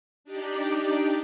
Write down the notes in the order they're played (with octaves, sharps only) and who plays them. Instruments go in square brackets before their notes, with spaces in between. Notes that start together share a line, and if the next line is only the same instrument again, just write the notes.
[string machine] D4 D#4 G4 D5